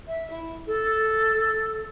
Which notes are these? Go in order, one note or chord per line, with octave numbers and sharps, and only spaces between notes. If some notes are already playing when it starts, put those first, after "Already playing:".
E5
E4
A4